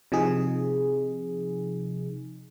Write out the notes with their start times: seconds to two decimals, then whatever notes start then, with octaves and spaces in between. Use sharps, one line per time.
0.12 C3 F3 D#4 G#4